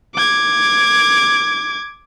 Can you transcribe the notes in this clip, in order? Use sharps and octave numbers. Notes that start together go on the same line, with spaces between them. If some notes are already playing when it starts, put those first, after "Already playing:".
D6 G#6